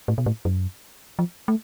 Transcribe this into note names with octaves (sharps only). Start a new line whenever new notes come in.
A2
B2
A2
F#2
F3
A3